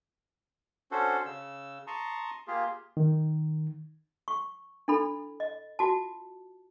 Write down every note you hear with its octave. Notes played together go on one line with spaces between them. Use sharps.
C#4 D4 F#4 A4 C5
C#3 E6
A5 A#5 C6 C#6 D#6
A#3 F4 G4 G#4
D#3
C#6
D4 E4 A4 B5
D#5
F4 F#4 A5